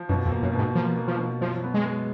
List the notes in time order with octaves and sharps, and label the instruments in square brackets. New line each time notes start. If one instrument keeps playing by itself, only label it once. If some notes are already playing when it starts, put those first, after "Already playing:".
Already playing: [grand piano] F3
[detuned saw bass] F#2 [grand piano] B2
[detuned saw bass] F2
[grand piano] A#3
[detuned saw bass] F#2
[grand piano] B2
[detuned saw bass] G#2
[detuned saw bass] F3 [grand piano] A#3
[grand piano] A#3
[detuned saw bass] F3
[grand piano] B2
[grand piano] F#2 [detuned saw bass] F3
[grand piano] B3
[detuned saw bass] G#3
[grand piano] G#3